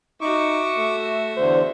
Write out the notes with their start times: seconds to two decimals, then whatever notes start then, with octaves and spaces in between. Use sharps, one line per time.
0.21 D#4 F#4 E5 C#6 D6
0.77 A3
1.37 E2 D3 C5